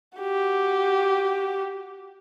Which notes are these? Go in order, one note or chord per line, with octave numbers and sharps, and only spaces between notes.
F#4 G4